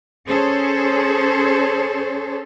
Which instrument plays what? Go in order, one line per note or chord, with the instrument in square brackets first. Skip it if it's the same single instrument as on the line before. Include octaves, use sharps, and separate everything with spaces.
[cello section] C#4 G#4 A4 C5 C#5